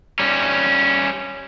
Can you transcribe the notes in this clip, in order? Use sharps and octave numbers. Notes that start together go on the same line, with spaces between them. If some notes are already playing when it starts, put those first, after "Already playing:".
G3 C#4